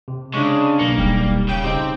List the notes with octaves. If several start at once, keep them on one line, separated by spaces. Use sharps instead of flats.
C3
C#3 G#3 D4 C#6
B1 A#3 C#7
D#1 G3
C#3 G5
C#3 C4 D#4 G4